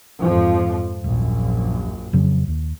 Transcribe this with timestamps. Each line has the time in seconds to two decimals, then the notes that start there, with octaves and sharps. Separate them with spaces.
0.20 F2 G#2 F3
1.04 D#1 A#1 F#2
2.13 F2 C#3 F#3
2.48 D#2